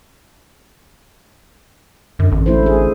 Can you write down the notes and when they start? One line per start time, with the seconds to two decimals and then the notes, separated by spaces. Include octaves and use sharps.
2.19 F#2 D3
2.32 A1 D4
2.46 A3 E4 C5
2.63 G#3 G#4